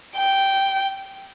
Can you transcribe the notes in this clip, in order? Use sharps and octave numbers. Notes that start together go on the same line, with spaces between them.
G5